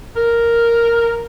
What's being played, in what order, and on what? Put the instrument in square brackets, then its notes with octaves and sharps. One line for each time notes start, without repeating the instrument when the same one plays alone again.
[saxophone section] A#4